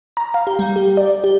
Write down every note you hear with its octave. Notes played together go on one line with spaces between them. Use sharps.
A#5
F5
G4
G3
G4
D5
G4